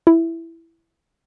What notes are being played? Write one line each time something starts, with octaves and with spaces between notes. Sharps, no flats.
E4